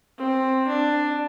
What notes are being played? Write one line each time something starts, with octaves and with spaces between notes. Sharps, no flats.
C4
D4